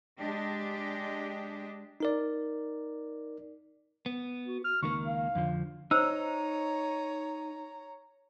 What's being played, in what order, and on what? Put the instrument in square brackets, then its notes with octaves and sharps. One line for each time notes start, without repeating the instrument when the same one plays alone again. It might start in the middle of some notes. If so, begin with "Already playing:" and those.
[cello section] G#3 D4 G4 D#5
[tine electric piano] D#4 A#4 D5
[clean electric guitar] B3
[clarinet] F#4
F6
[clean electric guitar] C#2 D#3 A#3 [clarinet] C#6
[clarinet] F5
[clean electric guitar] F2 D3 F3
[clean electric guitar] D#4 [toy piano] C5 E6 [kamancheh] C#5 A#5